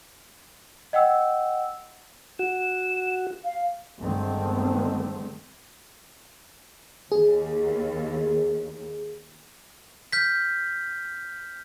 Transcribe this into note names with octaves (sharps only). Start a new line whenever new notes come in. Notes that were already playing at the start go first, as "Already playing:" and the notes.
D#5 F#5 G5 E6
F#4 E7
F5
G1 D3 D#3 G#3 A3 C4
D#2 G#4
F6 G6 B6